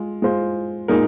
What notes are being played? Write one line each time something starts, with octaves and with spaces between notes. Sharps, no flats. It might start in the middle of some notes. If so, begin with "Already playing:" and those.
Already playing: G#3 F4
G#3 F4 C5
A#2 G#3 D#4 A#4